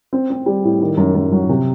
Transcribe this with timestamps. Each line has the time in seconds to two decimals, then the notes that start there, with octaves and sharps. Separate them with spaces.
0.13 C4
0.30 C4
0.46 G3
0.64 A2
0.81 D#3
0.97 F#2
1.15 F#2
1.32 F#3
1.49 C3